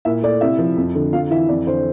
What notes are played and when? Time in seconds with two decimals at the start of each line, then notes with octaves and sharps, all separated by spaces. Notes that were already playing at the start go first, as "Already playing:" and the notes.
0.05 A#2 E4 E5
0.23 A3 D5
0.41 C3 E4 E5
0.59 F3
0.77 F2
0.95 D3
1.13 F2 F4 F5
1.30 E3 E4 E5
1.49 F2 D5
1.67 D3 C5